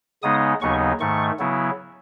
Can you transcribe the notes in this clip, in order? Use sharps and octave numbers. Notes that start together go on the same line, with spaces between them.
C#3 G#3 B3 D#4 D#6
D#2 C#3 F#3 B3 D#4 C#6
G#2 D#3 A3 C#6
C#3 F#3 B3 E4